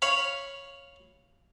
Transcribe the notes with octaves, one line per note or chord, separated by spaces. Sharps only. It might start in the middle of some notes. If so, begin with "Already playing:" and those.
C#5 F5 B5